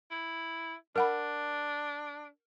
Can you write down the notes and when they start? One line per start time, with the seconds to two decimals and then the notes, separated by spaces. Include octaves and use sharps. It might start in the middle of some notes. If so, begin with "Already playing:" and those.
0.11 E4
0.96 D4 A#4 F#5 B5